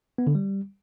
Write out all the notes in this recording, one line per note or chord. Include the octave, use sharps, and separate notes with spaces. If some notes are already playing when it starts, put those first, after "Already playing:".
B3
D3
G3